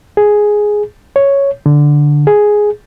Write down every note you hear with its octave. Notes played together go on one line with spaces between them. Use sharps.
G#4
C#5
D3
G#4